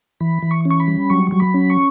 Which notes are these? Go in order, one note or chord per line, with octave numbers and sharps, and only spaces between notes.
E3 B5
E3
C#6
C#4
C#6
B5
G3
F#3 C#6
F#3 C#6
B5
C#4
C#6